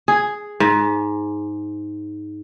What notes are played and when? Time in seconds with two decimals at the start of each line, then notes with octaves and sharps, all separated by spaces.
0.08 G#4
0.60 G#2